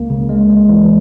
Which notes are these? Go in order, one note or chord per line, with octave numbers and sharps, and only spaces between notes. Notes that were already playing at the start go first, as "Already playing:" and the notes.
Already playing: C#2 A#3
C#3
G#3
G#3
E3